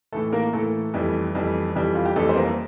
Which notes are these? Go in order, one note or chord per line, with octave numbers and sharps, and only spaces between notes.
A2 E3 A3 A4
A#3 A#4
A2 E3 A3 A4
F2 E3 G3
F2 E3 G3
F2 E3 G3
F4
G4
F2 E3 G3 A3 A4
C5
A#3 A#4